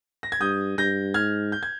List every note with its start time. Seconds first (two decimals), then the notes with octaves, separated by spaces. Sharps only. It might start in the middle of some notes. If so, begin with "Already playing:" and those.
0.23 A#6
0.32 G#6
0.41 G2 D#6 G6
0.78 G2 G6 A#6
1.14 G#2 F6 G#6
1.52 G6
1.63 G#6